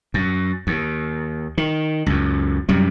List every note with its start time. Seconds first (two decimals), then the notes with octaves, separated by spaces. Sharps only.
0.14 F#2
0.67 D#2
1.58 D#3
2.06 C#2 F#2
2.69 F#2 C3 G3